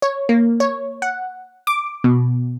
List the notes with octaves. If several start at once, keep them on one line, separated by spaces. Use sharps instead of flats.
C#5
A#3
C#5
F#5
D6
B2